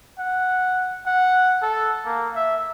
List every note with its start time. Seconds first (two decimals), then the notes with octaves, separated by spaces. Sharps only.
0.19 F#5
1.06 F#5
1.62 A4
2.06 A#3
2.36 E5